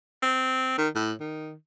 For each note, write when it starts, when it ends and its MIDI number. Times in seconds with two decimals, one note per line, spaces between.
0.22 0.75 60
0.78 0.89 51
0.95 1.13 45
1.20 1.54 51